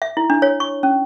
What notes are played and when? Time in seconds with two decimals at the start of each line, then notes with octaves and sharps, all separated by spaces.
0.02 E5
0.17 E4
0.30 D4
0.42 C#5
0.60 C#6
0.83 C#4